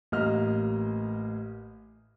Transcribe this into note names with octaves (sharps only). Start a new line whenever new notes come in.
A1 A#3 D#5 F6